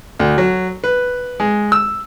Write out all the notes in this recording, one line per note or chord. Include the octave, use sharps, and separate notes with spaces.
D2
F#3
B4
G#3
E6